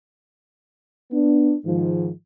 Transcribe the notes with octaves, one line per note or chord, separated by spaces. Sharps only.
B3 D4
G#2 D#3 F3